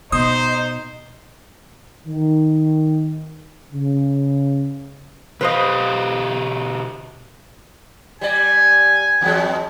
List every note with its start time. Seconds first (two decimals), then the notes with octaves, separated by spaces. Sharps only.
0.12 B2 D#4 C5 D#6
2.07 D#3
3.72 C#3
5.41 B2 G4 B4 C5 D#5 F5
8.21 G3 D5 G#5
9.21 E2 F#3 G#3